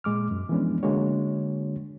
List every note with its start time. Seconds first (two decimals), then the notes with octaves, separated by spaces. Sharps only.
0.04 A#2 G#3 D6 F6
0.31 F#2
0.49 E3 F3 G#3 B3 C#4 D4
0.83 D3 G#3 A#3 D4 F#4 C#5